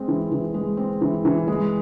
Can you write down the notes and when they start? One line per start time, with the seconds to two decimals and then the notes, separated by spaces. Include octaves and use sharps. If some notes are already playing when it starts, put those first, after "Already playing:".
Already playing: G#3 C4
0.08 E3
0.32 E3
0.54 G#3
0.77 C4
1.01 E3
1.25 E3
1.47 G#3